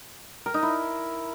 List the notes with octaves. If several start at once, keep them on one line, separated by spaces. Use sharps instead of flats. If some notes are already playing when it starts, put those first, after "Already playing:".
A#4
D#4
E4